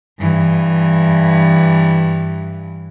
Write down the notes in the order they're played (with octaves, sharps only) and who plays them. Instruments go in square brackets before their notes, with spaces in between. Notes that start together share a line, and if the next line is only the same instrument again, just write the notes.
[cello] G2 E3